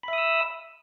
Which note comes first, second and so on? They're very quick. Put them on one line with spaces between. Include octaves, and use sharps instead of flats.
B5 E5 D#6 E6